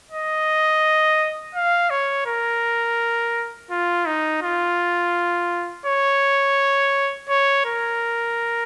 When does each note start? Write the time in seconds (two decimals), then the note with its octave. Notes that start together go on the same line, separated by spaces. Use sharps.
0.11 D#5
1.55 F5
1.90 C#5
2.26 A#4
3.71 F4
4.06 D#4
4.43 F4
5.86 C#5
7.29 C#5
7.65 A#4